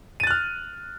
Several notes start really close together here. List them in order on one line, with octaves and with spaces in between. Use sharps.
D#7 A6 F#6 F6